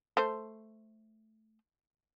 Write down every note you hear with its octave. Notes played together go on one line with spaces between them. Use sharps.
A3 C5